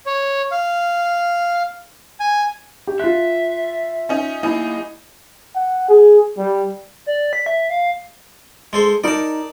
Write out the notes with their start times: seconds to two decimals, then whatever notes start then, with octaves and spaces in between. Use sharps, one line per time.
0.06 C#5
0.52 F5
2.20 G#5
2.87 G4
3.00 F4 E5 F#6
4.09 C#4 D#4
4.43 B1 A#3 D#4 E4 G#5
5.55 F#5
5.89 G#4
6.38 G3
7.06 D5
7.33 B6
7.46 E5
7.70 F5
8.73 G#3 A4 C5
9.04 D#4 A#4 D5 A5